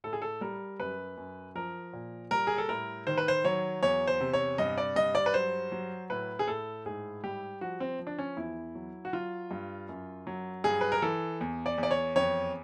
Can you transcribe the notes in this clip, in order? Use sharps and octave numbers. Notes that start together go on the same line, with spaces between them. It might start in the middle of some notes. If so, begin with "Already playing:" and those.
A2 A4
G#4
A4
G3 A#4
F#2 B4
F#2
F3 A#4
A#2
G3 A#4
G#4
A4
A2 A#4
D#3 C5
B4
C5
F#3 C#5
E2 C#5
C5
C3
C#5
G2 D#5
D5
G2 D#5
D5
B4
F#3 C5
F#3
A2 B4
G#4
A2 A4
G#2 G#4
G3 G4
F3 F#4
C4
F3
D4
C#4
E2 E4
F#3
F#4
F#3 F4
G2
F#2
F#3
G2 G#4
B4
A#4
E3 A4
E2
D5
E2
D5
C#5
F2 C#5